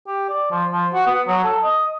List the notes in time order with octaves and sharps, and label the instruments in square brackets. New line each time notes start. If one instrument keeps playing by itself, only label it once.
[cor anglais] G4
D5
F3
F3
F#4
B3
F#3
A4
D#5